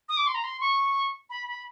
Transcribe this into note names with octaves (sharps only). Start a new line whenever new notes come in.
D#6
D6
C6
A#5
C6
C#6
B5
B5